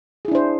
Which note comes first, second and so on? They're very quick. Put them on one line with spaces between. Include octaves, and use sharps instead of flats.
G#4 E4 D4 C5